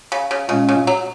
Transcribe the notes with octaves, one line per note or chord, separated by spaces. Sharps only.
C#3
C#3
A#2 C#3 G#3 C#4
C#3
F#3